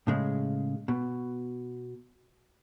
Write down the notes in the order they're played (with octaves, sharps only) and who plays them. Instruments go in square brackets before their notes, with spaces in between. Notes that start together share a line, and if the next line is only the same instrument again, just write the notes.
[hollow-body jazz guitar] A2 C#3 G#3
B2